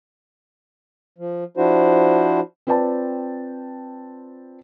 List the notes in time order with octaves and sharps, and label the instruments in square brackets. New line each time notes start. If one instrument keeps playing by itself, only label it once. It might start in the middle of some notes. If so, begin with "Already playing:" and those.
[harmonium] F3
F3 D4 E4 F#4 C5
[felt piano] C4 F4 B4 D5 G5 A5